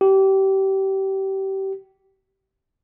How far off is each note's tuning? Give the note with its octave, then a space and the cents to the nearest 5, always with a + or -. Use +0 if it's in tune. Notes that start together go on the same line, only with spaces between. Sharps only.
G4 -25